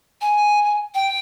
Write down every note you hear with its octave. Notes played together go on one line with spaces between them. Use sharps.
G#5
G5